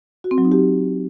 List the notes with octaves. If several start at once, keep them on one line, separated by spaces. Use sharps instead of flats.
F#4
C4
F#3
D#4
G4